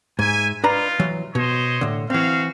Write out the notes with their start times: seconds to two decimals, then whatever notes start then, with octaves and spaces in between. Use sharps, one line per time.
0.19 G#2 E5 G#5
0.64 D4 D#4 F4 B4 A#5
1.00 E3 F#3
1.35 B2 C5 C#5 D#5
1.81 A2 D3
2.10 E3 C4 F#4 F5